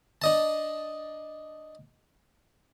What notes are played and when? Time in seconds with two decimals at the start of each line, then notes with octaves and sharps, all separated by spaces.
0.22 D4 D#5 A5